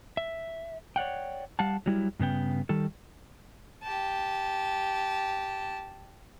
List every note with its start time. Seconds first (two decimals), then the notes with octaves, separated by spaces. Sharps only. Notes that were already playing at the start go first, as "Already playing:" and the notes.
0.17 E5
0.96 C#5 D5 F#5 G5
1.59 G3 F5 F#5 A5
1.86 F#3 G3 E4
2.20 G2 C#3 B3 G5
2.69 D#3 G3 A4
3.83 G4 A5